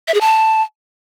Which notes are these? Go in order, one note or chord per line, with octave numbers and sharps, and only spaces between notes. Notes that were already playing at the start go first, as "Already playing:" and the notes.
E5
G#4
A5